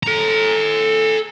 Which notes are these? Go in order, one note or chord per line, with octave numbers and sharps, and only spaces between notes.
A4 A#5